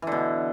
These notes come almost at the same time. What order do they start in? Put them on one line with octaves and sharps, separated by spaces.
E3 D3 B2